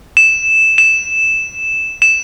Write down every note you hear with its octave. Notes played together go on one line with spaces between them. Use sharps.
E7
E7
E7